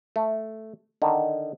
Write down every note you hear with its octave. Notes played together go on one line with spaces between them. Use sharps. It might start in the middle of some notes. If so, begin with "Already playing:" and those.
A3
D3 D#3